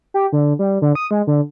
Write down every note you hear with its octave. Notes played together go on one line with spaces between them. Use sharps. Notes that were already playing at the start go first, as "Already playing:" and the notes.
G4
D3
G3
D3
D#6
G#3
D3